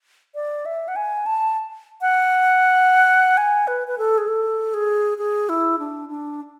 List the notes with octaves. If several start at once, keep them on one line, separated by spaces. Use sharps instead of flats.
D5
E5
F#5
G#5
A5
F#5
G#5
B4
B4
A4
G#4
A4
G#4
G#4
E4
D4
D4